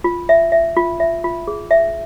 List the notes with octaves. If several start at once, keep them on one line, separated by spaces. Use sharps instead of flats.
F4
E5
E5
F4
E5
F4
G#4
E5